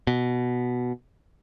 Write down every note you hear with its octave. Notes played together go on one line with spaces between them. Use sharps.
B2